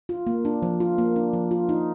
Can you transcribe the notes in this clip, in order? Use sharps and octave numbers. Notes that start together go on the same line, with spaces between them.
F4
A#3
D4
F3
F4
A#3
D4
F3
F4
D#4